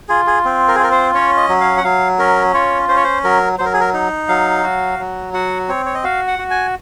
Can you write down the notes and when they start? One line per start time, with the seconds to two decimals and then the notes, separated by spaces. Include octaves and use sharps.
0.09 F4 G#4
0.27 G#4
0.45 C4
0.68 A#4
0.75 G#4
0.79 F4 A#4
0.91 C5
1.14 C#4 C#5
1.37 D#5
1.49 F#3
1.61 F5
1.78 F#5
1.84 F#3 F5
2.19 C#4 A#4
2.54 F4 C#5
2.89 C#4 C5
2.96 C#5
3.04 C5
3.24 F#3 A#4
3.58 F#3 C5
3.65 A#4
3.73 G#4
3.80 A#4
3.94 D#4
4.28 F#3 F5
4.63 F#4
4.99 F#3
5.34 F#4 F#5
5.68 C4 C#5
5.86 C#5
5.95 D#5
6.04 F#4 F5
6.28 F#5
6.39 F#4
6.50 G#5